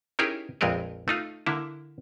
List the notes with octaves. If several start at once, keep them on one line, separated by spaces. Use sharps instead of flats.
C#4 D#4 E4 G4 G#4 A#4
A#1 F2 G#3 C4 A#4 B4
A3 D#4 F4
D3 A#3 E4